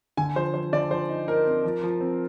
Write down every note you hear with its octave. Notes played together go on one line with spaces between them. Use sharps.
D3 G#5
F3 C5
F3 C5
D3 D5
F3 C5
D#4
D#4 A#4
C4
F3
F3
C4